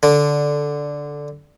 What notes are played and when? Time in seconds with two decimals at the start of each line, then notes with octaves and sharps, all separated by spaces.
0.03 D3